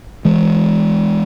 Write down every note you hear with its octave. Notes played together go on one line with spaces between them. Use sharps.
E3 G#3